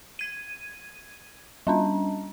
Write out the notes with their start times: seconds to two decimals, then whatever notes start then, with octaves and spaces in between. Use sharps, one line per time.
0.19 G#6 D#7
1.67 G3 C#4 D4